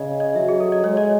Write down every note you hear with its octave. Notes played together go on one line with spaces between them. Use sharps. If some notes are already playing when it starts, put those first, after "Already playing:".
Already playing: C#3 D#5
D#5
F#3 E5
G#4
A4
D#5
G#3 C#5
D#5